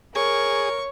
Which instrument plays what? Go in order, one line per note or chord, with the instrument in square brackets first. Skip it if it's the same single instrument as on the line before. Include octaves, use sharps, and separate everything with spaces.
[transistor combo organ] G#4 [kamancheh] A#4 [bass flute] C#5 [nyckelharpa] C#6